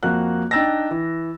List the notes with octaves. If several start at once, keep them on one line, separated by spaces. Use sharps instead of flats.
F2 A#3 F#4 F#6
D4 D#4 G5 E6 A6 A#6
E3